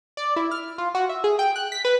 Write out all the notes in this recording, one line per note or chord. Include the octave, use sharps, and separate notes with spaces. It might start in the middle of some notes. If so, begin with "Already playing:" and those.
D5
E4
F6
F4
F#4
E5
G#4
G5
F#6
B6
B4